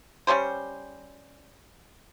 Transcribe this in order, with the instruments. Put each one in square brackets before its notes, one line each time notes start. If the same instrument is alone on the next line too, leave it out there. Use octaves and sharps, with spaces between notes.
[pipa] G3 C#4 G4 C5